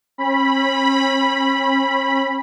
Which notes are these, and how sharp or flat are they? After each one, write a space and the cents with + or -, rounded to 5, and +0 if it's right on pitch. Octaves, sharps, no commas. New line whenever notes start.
C#4 -45 B5 -10